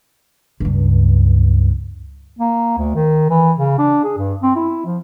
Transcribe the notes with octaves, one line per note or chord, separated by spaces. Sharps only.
C#2 G2
A#3
D2
D#3
E3
C#3
D4
G#4
G2
C4
E4
F3